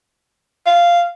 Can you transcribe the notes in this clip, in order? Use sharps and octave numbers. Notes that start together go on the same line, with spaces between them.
F5